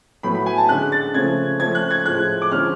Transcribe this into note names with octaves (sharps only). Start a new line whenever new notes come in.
A2 F#3 B3 B5
B5
G#5
A5
D3 G#3 C#4 F#6
A6
C#3 F3 A3 C#4 G#6
F3 A3 C#4 G#6
F#6
G#6
A2 F3 G#3 F#6
D6
D3 F3 G#3 C#4 F6